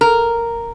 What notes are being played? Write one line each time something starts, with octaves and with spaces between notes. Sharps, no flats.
A#4